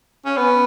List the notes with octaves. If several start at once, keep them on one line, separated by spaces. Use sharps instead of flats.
C#4
B3